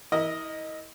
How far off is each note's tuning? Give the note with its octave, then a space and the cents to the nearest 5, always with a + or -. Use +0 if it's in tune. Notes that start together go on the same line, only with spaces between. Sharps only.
E4 -30 A#4 +10 D#5 +0